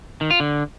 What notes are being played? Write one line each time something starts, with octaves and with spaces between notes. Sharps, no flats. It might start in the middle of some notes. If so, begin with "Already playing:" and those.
D#3
F4
D3